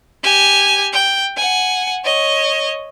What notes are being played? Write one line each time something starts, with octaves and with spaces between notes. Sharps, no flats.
G4 G#5
G5
F#5 G#5
C#5 D#5